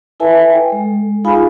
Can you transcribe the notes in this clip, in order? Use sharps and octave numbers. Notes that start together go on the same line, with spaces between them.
E4 A4 B4 E5 G#5 A5
G5 G#5
G#3 A4
D#4 F4 G#4 F5 G#5 B5